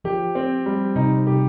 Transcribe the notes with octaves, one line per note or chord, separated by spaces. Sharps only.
F3 G4
C4
G3
C3 D#4
C3 G4